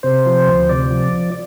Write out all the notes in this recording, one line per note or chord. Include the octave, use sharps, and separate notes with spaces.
C3 C5
F3
D2
C3 D5
F3